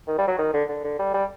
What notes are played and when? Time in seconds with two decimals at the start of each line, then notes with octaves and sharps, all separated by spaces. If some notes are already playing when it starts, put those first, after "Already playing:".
0.07 D#3
0.18 G3
0.27 F#3
0.38 D#3
0.53 D3
0.69 D3
0.84 D3
0.99 G3
1.14 G3